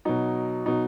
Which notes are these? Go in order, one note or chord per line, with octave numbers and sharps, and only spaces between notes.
B2 F#3 D#4
B2 F#3 D#4